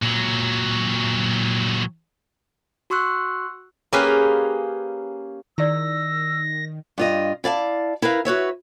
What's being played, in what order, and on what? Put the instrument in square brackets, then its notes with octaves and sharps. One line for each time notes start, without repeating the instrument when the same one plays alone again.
[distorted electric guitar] A#2 F#3
[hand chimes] F#4 C6 C#6 E6 F#6
[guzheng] A#3 C#4 G4 G#4 B4 F5
[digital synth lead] D#3 [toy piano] E4 G#4 D5 [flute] E6 [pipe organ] A#6
[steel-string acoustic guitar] G2 F4 D#5
E4 D5 F5 A5
E4 A#4 B4 F5
F#4 B4 C#5 E5